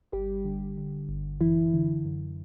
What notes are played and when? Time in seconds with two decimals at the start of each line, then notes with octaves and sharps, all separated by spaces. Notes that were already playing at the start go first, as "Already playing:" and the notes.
0.12 G1 G3 G4
0.45 D3
0.77 D3
1.09 G1
1.41 F#2 E3 E4
1.74 D3
2.05 F#2